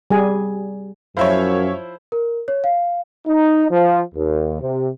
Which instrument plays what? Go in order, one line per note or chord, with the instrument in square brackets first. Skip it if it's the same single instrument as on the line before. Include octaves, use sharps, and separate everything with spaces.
[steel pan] G3 G#4 G#5
[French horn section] F#2 [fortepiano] F3 E4 C5 [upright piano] C#5 E5 F5
[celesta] A#4
C#5
F5
[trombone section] D#4
F3
D#2
C3